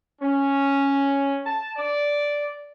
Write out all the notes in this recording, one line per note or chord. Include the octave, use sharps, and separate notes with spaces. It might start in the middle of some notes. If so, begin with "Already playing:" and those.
C#4
A5
D5